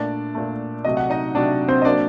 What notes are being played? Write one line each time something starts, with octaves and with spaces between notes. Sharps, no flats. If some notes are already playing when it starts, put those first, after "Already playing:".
Already playing: A#2 A3 D4 D5
A#2 A3
C3 F#3 A3 D#5
F#5
D#4 D#5
C3 F#3 A3 D4 D5
C4 C5
D#5
F#3 A#3 D4 D5